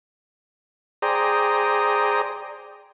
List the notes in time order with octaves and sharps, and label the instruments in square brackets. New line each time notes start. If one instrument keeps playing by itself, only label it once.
[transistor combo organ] G#4 C5 D5 G5 A#5 D#6